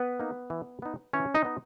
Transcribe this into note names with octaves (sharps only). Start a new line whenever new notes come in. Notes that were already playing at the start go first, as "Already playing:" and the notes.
Already playing: B3 B4
A#3 D#4
E3
B3 D#4
E3 C#4 C#5
D#4 D#5
B3 D#4